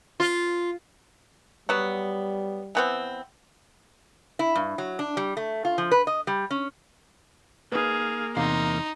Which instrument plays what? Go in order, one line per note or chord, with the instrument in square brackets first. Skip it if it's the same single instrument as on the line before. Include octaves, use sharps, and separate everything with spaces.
[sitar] F4
[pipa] F#3 B3 [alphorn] G3
[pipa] E3 B3 C4
[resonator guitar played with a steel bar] E4
G2
F#3
D4
G3
A3
F4
F3
B4
D#5
G3
C#4
[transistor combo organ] A#3 [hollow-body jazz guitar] D#4 B4 [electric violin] G#4 F5
[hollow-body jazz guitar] E2 C3 F5 [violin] D#4 [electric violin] C6